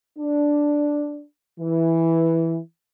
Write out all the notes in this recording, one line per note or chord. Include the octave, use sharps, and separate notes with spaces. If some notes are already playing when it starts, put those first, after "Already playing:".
D4
E3